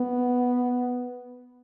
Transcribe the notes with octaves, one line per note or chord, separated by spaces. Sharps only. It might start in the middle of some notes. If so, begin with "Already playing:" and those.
Already playing: B3